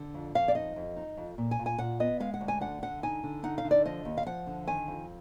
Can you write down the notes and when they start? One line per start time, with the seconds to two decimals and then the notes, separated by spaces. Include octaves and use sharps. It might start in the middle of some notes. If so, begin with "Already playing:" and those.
Already playing: D3
0.14 F2
0.35 F2 F5
0.48 D5
0.55 D#4 D#5
0.76 F2
0.97 D#4
1.17 F2
1.38 A#2
1.51 G#5
1.59 A#2
1.66 G#5
1.78 A#2 F#5
2.00 B3 D#5
2.20 G#3 F5
2.34 F#5
2.41 D2
2.48 G#5
2.61 D3 F#5
2.82 D3 F#5
3.03 D#4 G#5
3.23 D3
3.43 D#4 F#5
3.58 F5
3.64 D3
3.71 D5
3.85 F3 D#5
4.05 D#2
4.17 F5
4.26 F3 F#5
4.47 D3
4.67 D#3 G#5
4.88 F2